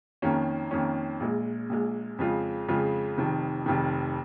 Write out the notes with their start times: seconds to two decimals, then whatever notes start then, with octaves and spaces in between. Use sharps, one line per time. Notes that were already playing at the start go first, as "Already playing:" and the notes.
0.22 F2 D#3 A#3 C#4
0.71 F2 D#3 A#3 C#4
1.20 A#1 A#2 G#3
1.69 A#1 A#2 G#3
2.19 F2 C#3 G#3 F4
2.68 F2 C#3 G#3 F4
3.18 F1 F2 D#3
3.66 F1 F2 D#3